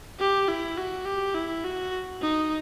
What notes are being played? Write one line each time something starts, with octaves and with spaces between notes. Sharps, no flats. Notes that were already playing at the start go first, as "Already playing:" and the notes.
G4
E4
F#4
G4
E4
F#4
D#4